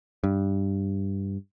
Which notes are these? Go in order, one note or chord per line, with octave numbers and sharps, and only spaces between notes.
G2